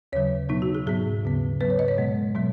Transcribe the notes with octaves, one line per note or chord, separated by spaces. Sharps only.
D#2 C#3 F#3 C#5
B2 F#3 B3 D#4
F#4
G#4
G#2 F#3 B3 G#4
D#2 C#3 B3
G#2 F#3 B3 B4
C#5
D#5
C#5
B2 G#3 B3
B2 F#3 B3